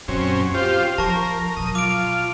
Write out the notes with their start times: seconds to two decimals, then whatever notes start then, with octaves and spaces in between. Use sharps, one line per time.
0.08 F#2 A#2 C4 C#4
0.54 F4 G4 C5
0.98 F3 A#4 A5 C#6
1.57 B2 F#3 D#6
1.75 F4 D6 D7